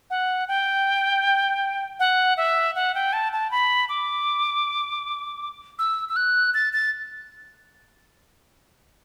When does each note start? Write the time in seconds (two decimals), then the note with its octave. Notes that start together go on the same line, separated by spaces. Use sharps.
0.10 F#5
0.48 G5
1.99 F#5
2.37 E5
2.75 F#5
2.95 G5
3.13 A5
3.33 A5
3.51 B5
3.89 D6
5.79 E6
6.09 E6
6.16 F#6
6.54 A6
6.73 A6